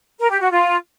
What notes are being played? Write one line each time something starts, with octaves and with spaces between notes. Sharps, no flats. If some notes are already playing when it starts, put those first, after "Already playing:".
A#4
G4
F#4
F4